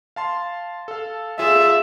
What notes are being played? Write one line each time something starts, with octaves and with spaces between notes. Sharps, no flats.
F5 A5 C6
A4 F5
F4 G#4 A4 E5